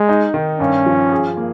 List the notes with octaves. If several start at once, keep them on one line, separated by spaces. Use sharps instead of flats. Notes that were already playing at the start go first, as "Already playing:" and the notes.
Already playing: G#3
D#4
D#3
G2 C#4
F3
G#4
A#3